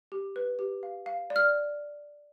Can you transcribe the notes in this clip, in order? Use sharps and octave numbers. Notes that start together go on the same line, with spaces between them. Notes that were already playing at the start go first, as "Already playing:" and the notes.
G4
B4
G4
F5
F5
D5
F6